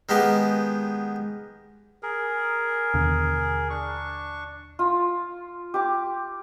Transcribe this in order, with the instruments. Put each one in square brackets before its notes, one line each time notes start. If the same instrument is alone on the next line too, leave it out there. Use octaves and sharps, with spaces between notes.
[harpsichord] D#3 G#3 B3 G4
[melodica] G#4 A#4
[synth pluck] D#2 B2 D3
[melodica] D4 C#6
[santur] F4
G4 D6